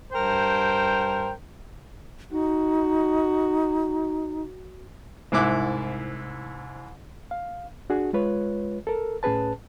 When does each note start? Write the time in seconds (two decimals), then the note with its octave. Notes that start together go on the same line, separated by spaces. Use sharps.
0.13 G2 A#4 C5 G5
2.31 D#4 F#4
5.32 C2 G#2 E4 D6 F#6
7.31 F5
7.90 D4 F#4 G#4
8.13 G#3 F4 B4 C#5
8.87 A4 A#4
9.23 A2 C#4 G#4 B4 A5